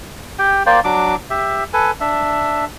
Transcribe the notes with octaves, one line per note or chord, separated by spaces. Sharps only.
G4 G5
A#3 C5 D5 G5
F#3 D4 D6
G4 E5
A4 B4 G#5
D4 E5